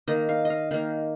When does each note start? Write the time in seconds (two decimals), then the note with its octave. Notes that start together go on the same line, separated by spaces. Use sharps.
0.08 D#3 A#3 D#5
0.29 F5
0.45 D#5
0.50 F5
0.71 D#3 A#3 F5